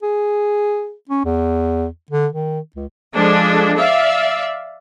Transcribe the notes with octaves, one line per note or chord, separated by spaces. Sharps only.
G#4
C#4
E2
D3
D#3
C#2
F3 G#3 D4 A4
D5 E5 F5